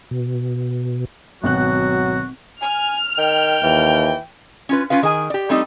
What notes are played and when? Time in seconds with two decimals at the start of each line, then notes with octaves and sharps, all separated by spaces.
0.11 B2
1.44 G#1 B2 F#3 F#4 F#6
2.62 G#5 F6
3.18 D#3 G5
3.64 D#2 E3
4.69 C#4 F4 B4
4.90 C#4 F4 B4 F5
5.02 D#3 G#4 A#4 G#5
5.30 G4 D5
5.50 G3 A3 C4 D#4 G4